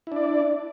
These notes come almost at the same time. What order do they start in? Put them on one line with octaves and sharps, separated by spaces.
E4 D4 D5